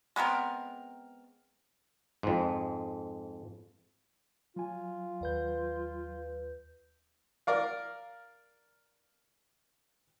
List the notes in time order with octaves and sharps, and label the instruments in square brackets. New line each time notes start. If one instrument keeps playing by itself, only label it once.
[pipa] G#3 B3 C4 A#4
[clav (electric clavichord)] F2 G#2
[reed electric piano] F#3 G#5 [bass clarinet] F4
[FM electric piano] D#2 B4 G6
[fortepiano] A#4 D5 F5